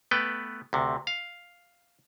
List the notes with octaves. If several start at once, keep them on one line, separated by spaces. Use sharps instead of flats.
A3 B3 B4 G5
D2 C3
F5